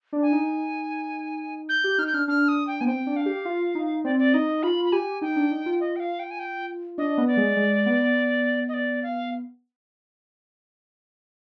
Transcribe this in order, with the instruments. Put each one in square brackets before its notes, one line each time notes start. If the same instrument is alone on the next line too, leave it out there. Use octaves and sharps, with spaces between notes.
[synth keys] D4
[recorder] G#5
[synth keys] D#4
[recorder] G6
[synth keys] G4
[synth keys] D#4 [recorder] F6
[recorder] G6
[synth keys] D4 [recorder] F6
[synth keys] D4 [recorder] F6
[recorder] D#6
G5
[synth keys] B3 [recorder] G#5
[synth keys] C4 [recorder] G5
[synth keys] D4
[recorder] F5
[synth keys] G4
F4
D#4
[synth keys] C4 [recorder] D5
[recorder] D5
[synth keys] D#4 [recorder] D#5
[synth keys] F4 [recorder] B5
[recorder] B5
[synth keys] G4 [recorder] G#5
[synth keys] D#4 [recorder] G5
[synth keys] D4
D#4
F4
[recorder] D#5
G5
F5
G5
G#5
G5
[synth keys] D4 [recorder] D#5
[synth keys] B3
[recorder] D5
[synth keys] G#3
G#3
B3
[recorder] D#5
D5
F5